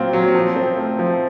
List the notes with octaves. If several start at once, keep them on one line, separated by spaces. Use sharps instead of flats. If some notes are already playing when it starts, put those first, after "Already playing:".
Already playing: A#2 F#3 C4 F4
F#3
F3
C4
A3
F3